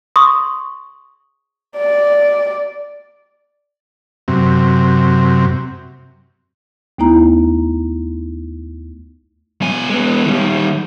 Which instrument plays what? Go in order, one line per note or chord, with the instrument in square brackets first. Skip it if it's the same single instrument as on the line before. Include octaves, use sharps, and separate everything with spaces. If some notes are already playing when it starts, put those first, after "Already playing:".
[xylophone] C6 C#6 D#6
[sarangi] D5
[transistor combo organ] F#2 C3
[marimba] D#2 A3 B3 D#4 E4 A#5
[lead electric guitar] B2 G#5
G#3 B3
D#3 G3